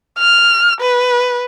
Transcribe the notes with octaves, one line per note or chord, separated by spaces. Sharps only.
F6
B4